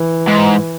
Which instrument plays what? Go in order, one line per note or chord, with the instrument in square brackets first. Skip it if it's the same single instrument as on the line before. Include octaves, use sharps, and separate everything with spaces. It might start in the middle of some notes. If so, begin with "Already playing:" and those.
Already playing: [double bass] E3
[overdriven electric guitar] G#2